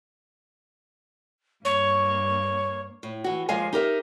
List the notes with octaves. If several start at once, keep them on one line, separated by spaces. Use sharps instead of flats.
G2 A#3 C#5
A2
E3 F#4
D#2 F3 G#3 D#5 F5 G#5
D#4 G4 A#4 E5